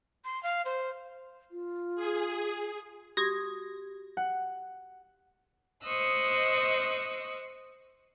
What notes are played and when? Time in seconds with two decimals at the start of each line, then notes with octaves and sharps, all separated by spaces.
0.25 C6
0.43 F5
0.65 C5
1.51 F4
1.95 G#4
3.17 F#4 G4 D#6 G#6 A#6
4.17 F#5
5.84 C5 D#5 C#6 D#6 E6 F#6